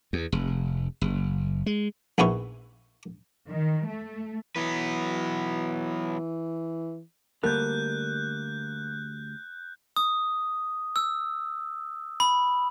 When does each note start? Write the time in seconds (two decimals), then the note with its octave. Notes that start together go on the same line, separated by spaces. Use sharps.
0.13 E2
0.32 F1
1.01 F#1
1.66 G#3
2.18 A#1 B3 D#4 E4 C#6
3.48 D#3
3.87 A3
4.56 E3 F#3 B3 B4
7.44 D2 G3 A#3 A4 F#6 G6
9.96 D#6
10.96 E6
12.20 B5